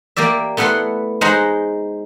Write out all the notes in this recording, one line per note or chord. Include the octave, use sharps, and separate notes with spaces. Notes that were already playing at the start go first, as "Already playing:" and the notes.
A#3 G4 D5 E5
A3 B3 E4 F#5 B5 C6
G#3 D#4 C5 F#5 A#5 B5